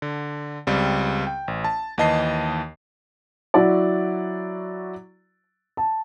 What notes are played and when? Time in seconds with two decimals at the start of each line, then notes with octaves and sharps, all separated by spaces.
0.02 D3
0.67 C#2 G3 C4
1.27 G5
1.48 A1
1.64 A5
1.98 D#2 E3 D#5 A5 C7
3.54 F#3 E4 F#4 D5
5.77 A5